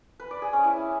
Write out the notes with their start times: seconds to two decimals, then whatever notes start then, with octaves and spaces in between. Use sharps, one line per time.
0.20 B4
0.31 D5
0.42 G#4
0.53 C#4
0.64 E4